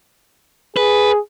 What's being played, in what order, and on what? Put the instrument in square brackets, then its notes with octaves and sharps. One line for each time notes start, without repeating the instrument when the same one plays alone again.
[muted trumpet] G#4 [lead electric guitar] B4